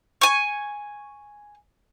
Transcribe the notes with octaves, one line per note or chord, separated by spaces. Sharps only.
G#5 C#6